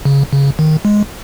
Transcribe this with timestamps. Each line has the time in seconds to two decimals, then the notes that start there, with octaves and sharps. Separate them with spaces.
0.05 C#3
0.33 C#3
0.59 D#3
0.85 G#3